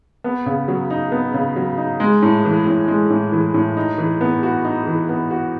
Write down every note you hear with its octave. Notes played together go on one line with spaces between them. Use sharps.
B3
C#3
F#3
D#4
B3
C#3
F#3
D#4
G#3
A2
E3
A2
G#3
A2
E3
A2
D#4
E3
B3
F#4
D#4
E3
B3
F#4